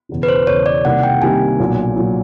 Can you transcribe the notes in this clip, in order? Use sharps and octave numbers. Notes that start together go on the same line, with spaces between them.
E1 E2 C#3
B4
C5
E1 E2 C#3 C#5
D5
C2 C3 D#3 G3 A#3 F#5
G5
C2 C3 D#3 G3 A#3 G#5
B1 A#2 F#3
A#2 F#3